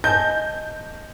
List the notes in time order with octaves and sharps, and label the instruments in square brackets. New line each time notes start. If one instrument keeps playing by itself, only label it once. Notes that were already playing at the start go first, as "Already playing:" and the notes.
[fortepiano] D#5 G#5 A5 [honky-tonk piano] G6